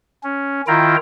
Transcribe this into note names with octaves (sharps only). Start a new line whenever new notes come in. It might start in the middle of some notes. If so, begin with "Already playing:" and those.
C#4
D#3 E4 F4 G5 A#5